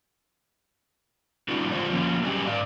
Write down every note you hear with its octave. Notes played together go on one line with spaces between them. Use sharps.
G3 C#4 D#4 F4 F#4
D3 G#3 F4 C5 C#5
F3 A#3 C#4
F#3 G3 C#4 G4 G#4
G#2 D5 F5